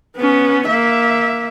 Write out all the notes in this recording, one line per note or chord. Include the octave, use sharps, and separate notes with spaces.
B3 C#4
A#3 E5